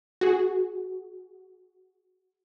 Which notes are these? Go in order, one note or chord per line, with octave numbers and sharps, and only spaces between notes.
F#4 G#4